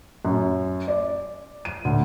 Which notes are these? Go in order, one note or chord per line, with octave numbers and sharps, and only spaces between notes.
F#2
D5
D#7
D2